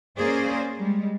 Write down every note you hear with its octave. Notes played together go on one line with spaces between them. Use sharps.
A#3 C#4 G#4 C5 D5
G3 G#3